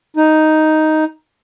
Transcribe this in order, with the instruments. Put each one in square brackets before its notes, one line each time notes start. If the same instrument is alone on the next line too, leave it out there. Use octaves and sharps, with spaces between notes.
[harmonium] D#4